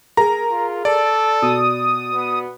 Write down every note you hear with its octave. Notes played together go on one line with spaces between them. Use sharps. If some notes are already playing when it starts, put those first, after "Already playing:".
G#4 A#4 A#5
F4
A4 D5
B2 D#6
B3